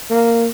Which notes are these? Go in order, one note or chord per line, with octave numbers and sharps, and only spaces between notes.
A#3